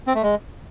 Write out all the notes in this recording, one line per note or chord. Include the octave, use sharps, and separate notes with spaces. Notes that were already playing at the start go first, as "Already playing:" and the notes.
C4
A3
G#3